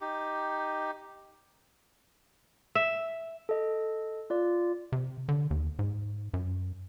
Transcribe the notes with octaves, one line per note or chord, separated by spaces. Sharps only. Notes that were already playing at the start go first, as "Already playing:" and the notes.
D#4 G4
E5
A4 D#5
F4 D5
C3
D3
D#2
G#2
F#2